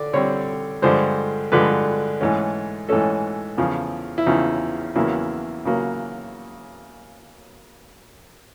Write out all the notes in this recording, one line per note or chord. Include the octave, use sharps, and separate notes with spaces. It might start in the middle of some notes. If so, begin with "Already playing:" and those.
Already playing: D3 D5
D3 G3 C4 C#5
G2 D3 F3 G#3 C5
G2 D3 F3 G#3 B4
G#2 E3 A3 C#4
G#2 E3 A3 C#4 A4
E2 C#3 F3
E4
E2 C#3 F3 D#4
E2 C#3 F#3 A#3 E4
C#3 F#3 A#3